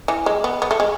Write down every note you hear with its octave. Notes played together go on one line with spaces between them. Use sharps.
E3
G#3
B3
B3
A3
G#3